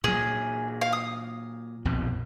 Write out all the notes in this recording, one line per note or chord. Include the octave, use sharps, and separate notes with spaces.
A#2 F#3 G#4
F5
D#6
A#1 F2 B2